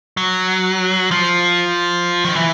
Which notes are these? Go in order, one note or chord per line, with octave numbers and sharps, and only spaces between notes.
F#3
F3
D#3
E3